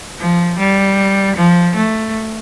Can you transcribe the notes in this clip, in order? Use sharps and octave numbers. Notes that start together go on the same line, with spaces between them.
F3
G3
F3
A3